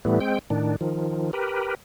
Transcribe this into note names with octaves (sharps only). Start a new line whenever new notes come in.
A2 E3 G3 A3 B3
G#3 C4 G5
A2 D#3 D4
D#3 F3
G4 A#4 B4